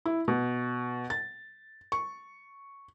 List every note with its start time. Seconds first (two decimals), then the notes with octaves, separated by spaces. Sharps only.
0.06 E4
0.28 B2
1.10 A6
1.92 C#6